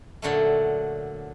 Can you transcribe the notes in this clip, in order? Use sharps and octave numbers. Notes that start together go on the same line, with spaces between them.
A#2 D3 F#3 A3